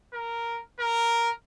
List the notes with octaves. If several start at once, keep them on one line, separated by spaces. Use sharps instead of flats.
A#4
A#4